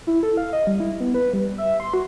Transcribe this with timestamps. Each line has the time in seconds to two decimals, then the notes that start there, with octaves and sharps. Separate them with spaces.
0.07 E4
0.23 A4
0.37 F5
0.53 D#5
0.67 G3
0.80 E4
1.00 B3
1.14 B4
1.33 G3
1.58 E5
1.80 C6
1.94 F#4